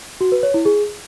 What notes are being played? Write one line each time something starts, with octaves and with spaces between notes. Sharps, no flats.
F#4
B4
C#5
E4
G#4